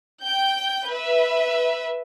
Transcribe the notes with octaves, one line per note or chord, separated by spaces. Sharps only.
G5 G6
B4 E5